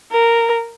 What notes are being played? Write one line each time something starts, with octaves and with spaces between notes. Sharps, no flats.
A#4